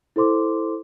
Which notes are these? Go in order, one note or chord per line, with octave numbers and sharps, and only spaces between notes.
E4 A4 C5 C6 D6